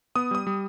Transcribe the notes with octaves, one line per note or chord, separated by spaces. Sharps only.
B3 D#6
G3 D#6
G3